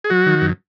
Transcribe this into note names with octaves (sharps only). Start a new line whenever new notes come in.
G#4
F#3 F#4
D#3
F#2